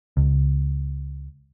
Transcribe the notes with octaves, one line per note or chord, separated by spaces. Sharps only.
C#2